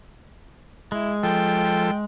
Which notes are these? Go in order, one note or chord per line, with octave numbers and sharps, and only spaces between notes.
G#3 E4
F3 A4 G5